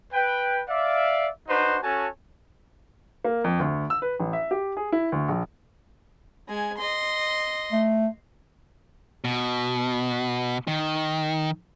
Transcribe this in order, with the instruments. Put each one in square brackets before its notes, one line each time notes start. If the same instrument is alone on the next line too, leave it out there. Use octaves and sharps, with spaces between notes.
[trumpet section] B4 G5
D5 E5 F5
D4 D#4 F#4 B4 C5
C#4 F#4 A4 C#5 G#5 A5
[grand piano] A#3
F2
D2
E6
B4
A1
E5
G4
G#4
E4
D2
A#1
[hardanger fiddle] G#3 G#5
D#5 C6
[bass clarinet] A3
[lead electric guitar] B2
D#3